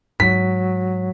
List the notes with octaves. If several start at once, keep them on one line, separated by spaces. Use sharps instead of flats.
G#2 F#3 B6